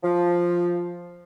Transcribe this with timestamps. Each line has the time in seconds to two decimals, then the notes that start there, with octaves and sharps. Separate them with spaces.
0.03 F3